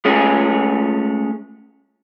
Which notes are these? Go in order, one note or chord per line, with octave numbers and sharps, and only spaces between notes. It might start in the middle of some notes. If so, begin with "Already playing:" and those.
G#3 A3 C#4 G#4